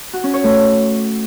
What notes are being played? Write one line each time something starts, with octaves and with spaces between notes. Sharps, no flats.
F#4
C#4
C#5
A3